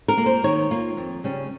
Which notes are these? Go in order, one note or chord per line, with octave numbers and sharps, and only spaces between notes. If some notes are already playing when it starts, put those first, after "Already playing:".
A#4
A#3 F4
C5
D#3 C#5
A#3 F4
F2
C#3 G3 C#4